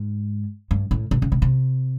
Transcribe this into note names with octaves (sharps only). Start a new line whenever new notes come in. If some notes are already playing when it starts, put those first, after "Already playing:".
Already playing: G#2
G2
A2
B2
C#3
C3
C3